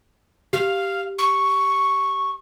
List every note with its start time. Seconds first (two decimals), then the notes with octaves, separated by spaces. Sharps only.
0.53 G4 F5
1.18 C#6